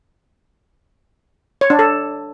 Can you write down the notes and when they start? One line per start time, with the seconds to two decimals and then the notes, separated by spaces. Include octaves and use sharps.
1.61 C#5
1.70 D4
1.79 A4